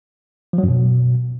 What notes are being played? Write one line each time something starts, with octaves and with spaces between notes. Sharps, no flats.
F3
F#3
F#2
B2